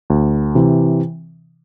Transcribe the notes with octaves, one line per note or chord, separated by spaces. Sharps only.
D2
C3 E3